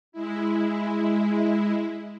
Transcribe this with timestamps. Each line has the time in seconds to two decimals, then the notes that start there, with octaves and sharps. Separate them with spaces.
0.12 G#3 E4